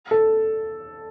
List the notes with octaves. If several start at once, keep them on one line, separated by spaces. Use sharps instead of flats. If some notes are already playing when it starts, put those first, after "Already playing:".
A4